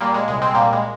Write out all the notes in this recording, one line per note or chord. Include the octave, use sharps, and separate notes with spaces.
A#2 G3 A#3
G#3
C2 G#3
G#3 C4
A#2 G3 A#3
G#3